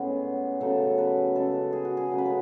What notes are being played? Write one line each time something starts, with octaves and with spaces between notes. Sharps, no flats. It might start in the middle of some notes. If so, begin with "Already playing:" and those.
Already playing: A2 G#3 B3 C#4 G#4
C#3 F#3 A3 A4
B4
C#3 G#3 A4
G#4
F#4
G#4
C#3 F#3 A3
B4
A4